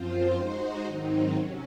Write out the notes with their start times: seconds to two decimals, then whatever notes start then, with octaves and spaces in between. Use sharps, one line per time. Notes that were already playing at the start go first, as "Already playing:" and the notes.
Already playing: F#2 F3 C4 F4 C5
0.34 G#3 D#4 F#4 C5
0.85 G#2 D#3 F#3 C4 D#4
1.35 C3 F#3 C#4